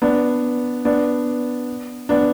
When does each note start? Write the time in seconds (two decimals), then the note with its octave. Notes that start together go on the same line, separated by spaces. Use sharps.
0.02 B3 D4
0.85 B3 D4
2.09 B3 D4